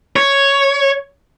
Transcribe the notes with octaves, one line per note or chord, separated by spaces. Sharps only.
C#5